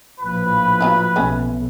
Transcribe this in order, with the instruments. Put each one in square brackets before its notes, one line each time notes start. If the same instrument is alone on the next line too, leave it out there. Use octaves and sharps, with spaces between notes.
[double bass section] A#1 A2 F3 [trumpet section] B4
[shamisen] F#3 E4 F4
[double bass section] B1 [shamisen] A3 C#4